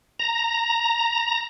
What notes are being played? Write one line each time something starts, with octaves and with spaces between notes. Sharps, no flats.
A#5